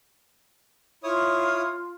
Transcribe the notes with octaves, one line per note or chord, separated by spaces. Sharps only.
E4 F4 C#5 D#6